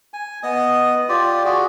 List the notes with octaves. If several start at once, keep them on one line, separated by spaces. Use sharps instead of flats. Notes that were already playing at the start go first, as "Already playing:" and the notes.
G#5
B3 D#5 D#6
F4 G4 D5
F#4 G#4